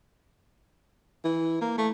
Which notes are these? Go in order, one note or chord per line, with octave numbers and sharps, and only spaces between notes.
E3
A#3
A3